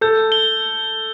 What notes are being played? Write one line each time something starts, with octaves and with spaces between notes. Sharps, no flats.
A4 G6
G7